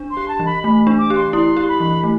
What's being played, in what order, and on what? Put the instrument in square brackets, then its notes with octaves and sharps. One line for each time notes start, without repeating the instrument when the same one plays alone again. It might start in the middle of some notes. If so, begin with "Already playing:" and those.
Already playing: [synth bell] D4
[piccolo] C6
[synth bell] G4
[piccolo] A5
[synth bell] E3
[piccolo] B5
[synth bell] A3 [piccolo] B5
[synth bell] D4
[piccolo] D6
[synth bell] G4
[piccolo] C6
[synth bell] E4 [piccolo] C6
[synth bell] G4
[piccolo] B5
[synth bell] E3
A3